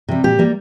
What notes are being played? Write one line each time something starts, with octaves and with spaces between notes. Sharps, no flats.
C3 G3
A#2 G4
G3 A#3